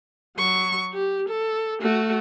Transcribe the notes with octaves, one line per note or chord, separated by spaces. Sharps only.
F#3 C#6
G4
A4
A3 F#4